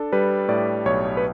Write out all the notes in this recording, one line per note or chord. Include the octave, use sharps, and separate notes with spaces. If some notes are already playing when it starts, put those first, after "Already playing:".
Already playing: D4 A4
G3 B4
A2 D5
B1 C#5
B4